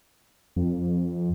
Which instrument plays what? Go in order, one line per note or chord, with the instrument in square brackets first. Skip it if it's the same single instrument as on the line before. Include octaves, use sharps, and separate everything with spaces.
[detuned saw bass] F2